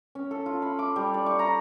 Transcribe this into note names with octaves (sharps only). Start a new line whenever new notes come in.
C#4
A4
F4
B5
D6
G3
D5
C#6
A#5